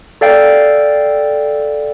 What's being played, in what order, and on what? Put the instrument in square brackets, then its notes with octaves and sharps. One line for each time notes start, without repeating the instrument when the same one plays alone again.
[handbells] A4 D5 F5 G5